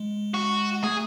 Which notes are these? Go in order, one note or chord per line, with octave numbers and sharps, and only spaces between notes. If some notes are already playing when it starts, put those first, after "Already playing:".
Already playing: G#3
F#4
A3 G#4